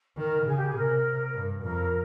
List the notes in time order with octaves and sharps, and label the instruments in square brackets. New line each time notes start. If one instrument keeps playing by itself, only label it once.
[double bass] D#3 [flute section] A#4
[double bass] C#3 [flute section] G#4
[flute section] G4
G#4
[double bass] C3 [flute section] A#4
[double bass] G2
[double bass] F2 [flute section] A#4